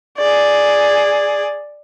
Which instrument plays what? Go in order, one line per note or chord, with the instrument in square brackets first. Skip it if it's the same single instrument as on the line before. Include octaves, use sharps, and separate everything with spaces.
[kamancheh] G#4 D5